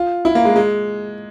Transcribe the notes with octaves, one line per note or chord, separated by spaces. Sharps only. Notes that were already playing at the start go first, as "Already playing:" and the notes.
Already playing: F4
E4
A#3
G#3
G#3